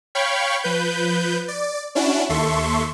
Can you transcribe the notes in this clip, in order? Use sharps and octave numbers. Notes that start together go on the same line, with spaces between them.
C#5 F5 G5 B5 C#6
F3 B4 G6
D5
C#4 D4 E4 F#4
D#2 A4 E5 C6 C#6